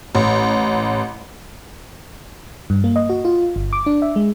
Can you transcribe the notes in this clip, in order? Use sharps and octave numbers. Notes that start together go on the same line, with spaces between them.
A1
G2
A#3
D#5
F#4
F4
G1
D6
D4
E5
G#3